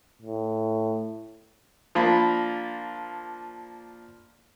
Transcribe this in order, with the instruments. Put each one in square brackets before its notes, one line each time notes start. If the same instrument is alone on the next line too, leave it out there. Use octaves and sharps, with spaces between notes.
[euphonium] A2
[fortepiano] F3 A#3 D4 B5